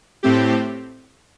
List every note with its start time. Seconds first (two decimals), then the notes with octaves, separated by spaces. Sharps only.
0.23 A2 A3 C4 G4